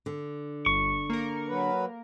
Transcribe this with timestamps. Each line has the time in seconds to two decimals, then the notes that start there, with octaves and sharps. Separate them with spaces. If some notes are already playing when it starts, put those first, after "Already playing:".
0.06 D3
0.66 G1 C#6
1.10 A#3 A#4
1.48 F#3 B4